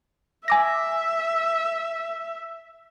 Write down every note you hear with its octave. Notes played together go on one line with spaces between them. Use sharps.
E5 G#5 D6 A#6